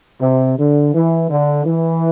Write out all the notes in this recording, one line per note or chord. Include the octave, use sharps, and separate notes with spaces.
C3
D3
E3
D3
E3